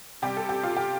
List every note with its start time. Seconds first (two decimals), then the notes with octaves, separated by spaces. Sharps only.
0.22 C3 G3 G4
0.37 A4
0.49 G4
0.63 F4
0.77 G4